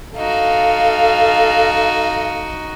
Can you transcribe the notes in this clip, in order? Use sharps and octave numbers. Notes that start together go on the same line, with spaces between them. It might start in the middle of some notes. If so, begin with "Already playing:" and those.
D#4 F#4 A4 F5